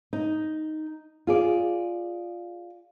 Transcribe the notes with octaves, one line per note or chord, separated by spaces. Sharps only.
D#4
F4 G#4 D5